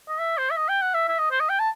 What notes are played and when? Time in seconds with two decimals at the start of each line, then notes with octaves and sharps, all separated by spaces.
0.08 D#5
0.19 E5
0.38 C5
0.50 E5
0.57 D#5
0.69 G5
0.82 F#5
0.94 E5
1.08 E5
1.19 D#5
1.31 C5
1.40 D#5
1.50 G5
1.60 A5